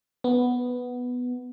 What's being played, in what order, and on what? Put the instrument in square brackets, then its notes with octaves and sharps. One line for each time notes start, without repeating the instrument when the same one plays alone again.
[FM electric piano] B3